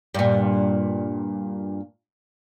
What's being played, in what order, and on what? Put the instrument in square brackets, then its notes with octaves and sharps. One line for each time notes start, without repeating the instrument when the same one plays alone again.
[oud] G2 A#2